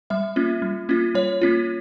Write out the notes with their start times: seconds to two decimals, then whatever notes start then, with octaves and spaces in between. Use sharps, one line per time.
0.10 G3 E5
0.36 A#3 C#4 F4
0.62 G3
0.89 A#3 C#4 F4
1.15 G3 C#5
1.41 A#3 C#4 F4